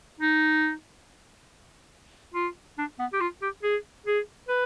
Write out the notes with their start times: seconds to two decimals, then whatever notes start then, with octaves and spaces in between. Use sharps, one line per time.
0.21 D#4
2.34 F4
2.78 D4
2.99 B3
3.13 G4
3.20 F4
3.42 G4
3.63 G#4
4.06 G#4
4.49 B4